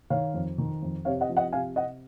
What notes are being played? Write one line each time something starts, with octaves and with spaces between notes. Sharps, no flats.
D#3 C#5 F5
F2
D#3
F2
C3 C#5 F5
D#5 F#5
F3
D#5 F#5
C3 F5 G#5
C3 D#5 F#5